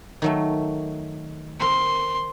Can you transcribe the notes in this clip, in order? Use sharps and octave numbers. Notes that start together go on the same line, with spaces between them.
D#3 F#3 A3
C4 A#4 C6